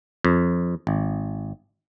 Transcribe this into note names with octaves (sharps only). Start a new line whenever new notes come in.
F2
G#1